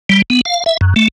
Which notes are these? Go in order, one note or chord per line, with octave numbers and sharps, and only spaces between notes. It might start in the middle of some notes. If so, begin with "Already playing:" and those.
G3
B3
F5
E5
F#2
A3